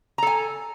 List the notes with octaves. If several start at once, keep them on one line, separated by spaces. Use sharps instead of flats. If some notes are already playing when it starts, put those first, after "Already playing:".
A4 G#5 A#5